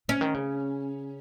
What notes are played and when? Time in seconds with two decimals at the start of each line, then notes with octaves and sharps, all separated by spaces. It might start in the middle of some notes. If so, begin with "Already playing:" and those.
0.09 C#3 C#4
0.21 D#3
0.34 C#3